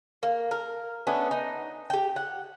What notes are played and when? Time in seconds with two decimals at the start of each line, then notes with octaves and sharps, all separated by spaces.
0.23 A#3
0.51 A#4
1.07 A3 B3 C#4 D4
1.31 D#4
1.90 G4 G5
2.16 F#5